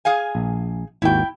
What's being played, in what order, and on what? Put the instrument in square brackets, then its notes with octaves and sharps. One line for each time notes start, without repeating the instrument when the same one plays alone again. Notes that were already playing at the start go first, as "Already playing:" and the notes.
[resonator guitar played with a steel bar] G#4 F5 G#5
[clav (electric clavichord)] A#1
[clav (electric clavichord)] G#1 D#2 F#4 [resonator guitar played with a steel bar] E4 G5